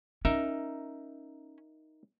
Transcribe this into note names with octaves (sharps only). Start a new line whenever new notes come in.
C#4 D#4 A#4 E5